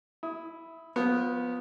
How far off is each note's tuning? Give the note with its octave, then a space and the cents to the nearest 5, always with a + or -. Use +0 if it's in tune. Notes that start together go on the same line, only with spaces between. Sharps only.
E4 +0 D#6 +30
F3 +25 B3 +0